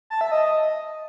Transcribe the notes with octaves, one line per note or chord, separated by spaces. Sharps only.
A5
E5
D#5